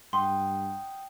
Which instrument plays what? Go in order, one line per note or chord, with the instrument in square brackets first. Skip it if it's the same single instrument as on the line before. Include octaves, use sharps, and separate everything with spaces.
[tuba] G2 [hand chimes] F#5 G5 D#6 [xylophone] C6